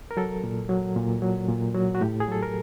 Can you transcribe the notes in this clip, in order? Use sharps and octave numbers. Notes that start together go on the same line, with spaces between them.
A#4
F#3 A4
A#2
F#3
A#2
F#3
A#2
F#3 F#4
F#4
A2 G4
G#4
F#3 A4
A#4